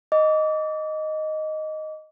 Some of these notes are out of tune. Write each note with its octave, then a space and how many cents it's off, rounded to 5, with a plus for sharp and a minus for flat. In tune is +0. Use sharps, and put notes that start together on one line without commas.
D#5 +0 D6 -30